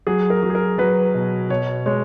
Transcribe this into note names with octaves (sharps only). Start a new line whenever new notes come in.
F#3 G#4
A#4
F#3
G#4
A#4
F#3 B4
B2
B2 C#5
G#3 C#5